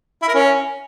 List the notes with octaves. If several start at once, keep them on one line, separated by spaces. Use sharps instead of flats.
E4
A#4
C#4